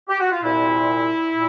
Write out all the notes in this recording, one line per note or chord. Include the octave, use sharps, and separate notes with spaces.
G4
F#4
F4
C2 A#2 E4
A#2